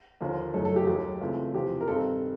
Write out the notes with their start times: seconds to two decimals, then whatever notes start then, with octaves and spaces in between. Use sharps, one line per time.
0.21 D#2 D3 F3 A#3
0.54 F#1 F#2 D#3 F#3 A3 A4
0.65 A4
0.76 G4
0.82 G#4
0.87 D#2 D#3 F#3 G4
1.21 C#2 C#3 E3 A3 C4
1.54 E2 C3 F3 G4
1.81 A#4
1.88 G2 D#3 G3 C4 A4